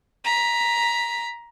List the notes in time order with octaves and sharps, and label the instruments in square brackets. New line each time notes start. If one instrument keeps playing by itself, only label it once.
[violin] A#5 B6